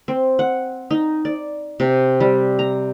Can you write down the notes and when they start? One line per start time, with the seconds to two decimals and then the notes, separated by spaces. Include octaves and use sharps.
0.08 C4
0.39 F#5
0.91 D#4
1.25 D5
1.80 C3
2.20 G3
2.59 A#5